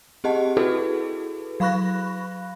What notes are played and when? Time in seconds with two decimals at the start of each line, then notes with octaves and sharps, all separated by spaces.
0.24 C4 G4 G#4 D#5 F#5 A5
0.57 E4 F#4 G#4 A4 B4
1.60 F#3 F5 B5 C#6 F#6 A#6